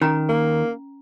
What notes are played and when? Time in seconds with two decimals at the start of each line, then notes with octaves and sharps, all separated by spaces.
0.01 D#3 C#4 A#5
0.28 A#3